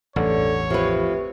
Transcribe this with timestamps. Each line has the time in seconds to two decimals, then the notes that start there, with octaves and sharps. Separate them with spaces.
0.16 A1 E2 G2 D3 C#5
0.70 C3 F3 B4